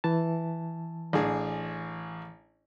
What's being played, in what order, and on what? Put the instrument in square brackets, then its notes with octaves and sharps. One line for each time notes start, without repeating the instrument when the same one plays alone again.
[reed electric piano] E3 A5
[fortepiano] A1 D4 G#4